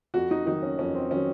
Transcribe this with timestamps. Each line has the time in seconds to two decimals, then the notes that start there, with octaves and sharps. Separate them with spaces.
0.14 F2 F#4
0.31 D#4
0.46 D#3 F#3 D#4
0.63 C#4
0.79 F2 C#4
0.95 C4
1.11 D#3 F#3 C#4